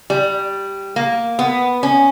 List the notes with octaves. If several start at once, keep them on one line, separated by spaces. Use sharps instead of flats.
G3
A#3
B3
C#4